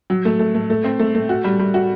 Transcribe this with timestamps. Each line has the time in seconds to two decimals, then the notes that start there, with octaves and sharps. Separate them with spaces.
0.10 F#3
0.25 A3
0.39 A3
0.55 A3
0.70 A3
0.84 C4
0.99 A3
1.15 A3
1.29 F#4
1.44 G3
1.59 G3
1.74 F#4